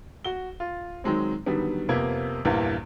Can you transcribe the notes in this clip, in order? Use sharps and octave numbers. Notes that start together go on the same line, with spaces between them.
F#4 G7
F4
D#3 F#3 G#3 C4
D3 D#3 F#3 G3 B3
F2 C3 A#3 B3 G#6
A#1 E2 G2 E3 A#3